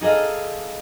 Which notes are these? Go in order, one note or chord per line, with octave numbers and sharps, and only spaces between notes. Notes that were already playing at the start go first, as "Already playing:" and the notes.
D#4 G#4 A4 D#5 F5